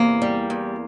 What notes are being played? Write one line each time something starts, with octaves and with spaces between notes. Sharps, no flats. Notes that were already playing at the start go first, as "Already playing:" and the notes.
Already playing: E2 C3 A#3
G3
E2